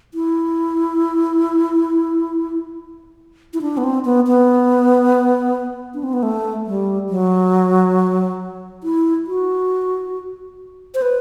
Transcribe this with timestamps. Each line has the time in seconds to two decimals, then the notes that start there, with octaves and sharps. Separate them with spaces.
0.14 E4
3.54 E4
3.62 D4
3.77 B3
3.84 C4
4.05 B3
4.27 B3
5.94 D4
6.03 C4
6.13 B3
6.23 A3
6.67 G3
7.09 F#3
8.84 E4
9.27 F#4
10.94 C5
11.02 B4